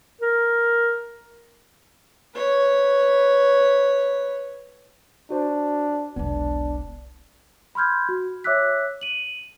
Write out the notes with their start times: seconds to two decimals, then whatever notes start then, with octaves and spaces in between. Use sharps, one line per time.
0.21 A#4
2.34 B4 C#5
5.30 D4 F#4 C5
6.16 E1 B1 B3 D4
7.75 B5 C6 F6 G6 G#6
8.09 F#4
8.44 C#5 E5 D6 E6 F#6 B6
9.01 D#7 F#7